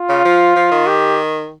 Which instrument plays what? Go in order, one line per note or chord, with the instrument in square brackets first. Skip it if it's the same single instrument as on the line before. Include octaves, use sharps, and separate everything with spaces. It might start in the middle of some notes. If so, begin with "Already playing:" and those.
Already playing: [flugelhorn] F4
[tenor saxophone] C#3
F3
F3
D#3
[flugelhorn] G4